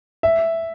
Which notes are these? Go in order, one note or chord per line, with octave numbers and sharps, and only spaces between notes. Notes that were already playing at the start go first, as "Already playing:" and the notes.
E5